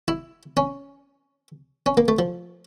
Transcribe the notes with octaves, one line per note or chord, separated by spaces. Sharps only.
E4
C#4
C#4
A#3
A3
F3